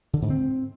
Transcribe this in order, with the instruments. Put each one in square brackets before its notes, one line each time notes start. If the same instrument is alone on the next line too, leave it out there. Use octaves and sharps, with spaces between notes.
[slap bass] D3
G#2
C4